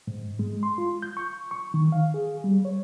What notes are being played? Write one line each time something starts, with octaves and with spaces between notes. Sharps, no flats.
G#2
G#3
C6
F4
G6
C#6
C#6
D#3
F5
G#4
G3
C#5